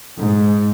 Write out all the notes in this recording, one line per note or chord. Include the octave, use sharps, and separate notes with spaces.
G#2